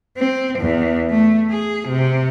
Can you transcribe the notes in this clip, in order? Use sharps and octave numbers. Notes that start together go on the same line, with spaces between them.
C4
E2
A3
G#4
C3